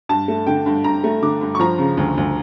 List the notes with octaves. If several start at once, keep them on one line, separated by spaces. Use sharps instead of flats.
G2 A5
A3
D3 G5
G2
G2 A#5
A3
D3 D6
G2
C#6
F3 A#5
C#3
D2
D2